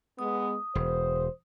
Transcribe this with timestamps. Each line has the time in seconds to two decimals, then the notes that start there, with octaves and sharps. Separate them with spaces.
0.19 G#3 B3 D#6
0.75 E1 C5